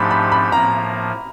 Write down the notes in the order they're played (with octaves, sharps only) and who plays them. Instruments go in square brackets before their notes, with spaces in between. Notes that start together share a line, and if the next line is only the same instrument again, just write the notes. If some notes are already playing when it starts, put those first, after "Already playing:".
Already playing: [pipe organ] G#2 F3 A3 D4 G4 [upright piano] B5
[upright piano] B5
B5
[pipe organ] A2 F3 A#3 [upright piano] A#5